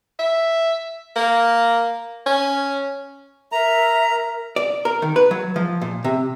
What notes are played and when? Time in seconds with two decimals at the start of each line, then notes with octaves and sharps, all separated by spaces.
0.19 E5
1.16 A#3
2.26 C#4
3.52 A#4 E5 A#5
4.56 D5
4.85 A#4
5.02 D#3
5.16 B4
5.31 F#3
5.56 F3
5.82 A#2
6.04 C3